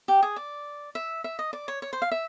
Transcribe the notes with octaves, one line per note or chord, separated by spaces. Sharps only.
G4
G#4
D5
E5
E5
D#5
D5
C#5
C#5
C5
F5
E5